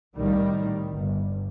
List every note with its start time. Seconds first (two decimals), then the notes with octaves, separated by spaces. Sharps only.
0.16 C2 A2 D#3 G3
0.90 G1